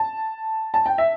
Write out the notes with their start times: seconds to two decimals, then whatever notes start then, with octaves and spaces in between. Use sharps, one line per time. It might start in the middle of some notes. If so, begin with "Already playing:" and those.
Already playing: A5
0.74 A5
0.86 G5
0.98 E5